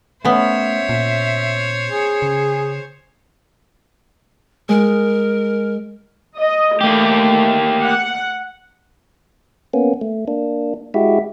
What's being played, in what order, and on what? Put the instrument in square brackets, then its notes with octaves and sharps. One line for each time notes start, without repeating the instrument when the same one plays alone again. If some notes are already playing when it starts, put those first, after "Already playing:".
[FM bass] A3 [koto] B3 C#4 [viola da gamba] C5 C#5 [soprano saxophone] E5
[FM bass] A#2
[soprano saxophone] G#4
[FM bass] C#3
[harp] G#3 [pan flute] A#4
[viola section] D#5
[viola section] A3 [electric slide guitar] A#3 G4
[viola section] F#5
[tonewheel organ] A#3 B3 C#4
A3
A#3 D4
G#3 E4 F#4 G4 E5